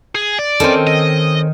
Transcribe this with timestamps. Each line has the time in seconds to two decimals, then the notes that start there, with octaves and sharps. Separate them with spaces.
0.15 G#4
0.39 D5
0.60 D#3 C4 C#4 A4
0.87 D#5